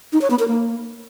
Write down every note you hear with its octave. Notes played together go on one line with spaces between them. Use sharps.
D#4
C#5
B3
A#4
A#3